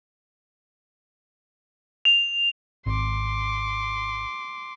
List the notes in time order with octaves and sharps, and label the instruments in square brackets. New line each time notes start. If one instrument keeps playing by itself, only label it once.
[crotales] F7
[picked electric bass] G#1 [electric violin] C6 D6